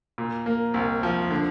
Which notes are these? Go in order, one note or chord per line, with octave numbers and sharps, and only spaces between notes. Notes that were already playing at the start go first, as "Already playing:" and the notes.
A#2
A#3
C2
F3
D3